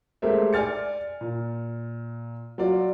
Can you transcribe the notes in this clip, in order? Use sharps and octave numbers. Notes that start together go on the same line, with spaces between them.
G#3 A3 G4 A#4 C5 E5
D5 G#5 F6 A6 C#7
A#2
F#3 F4 D5